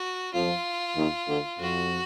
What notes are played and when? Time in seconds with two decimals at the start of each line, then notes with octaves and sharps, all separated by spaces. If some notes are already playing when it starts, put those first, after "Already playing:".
Already playing: F#4
0.33 F2 F3 F4
0.96 D#2 D#3
1.28 D2 D3
1.59 F2 F#4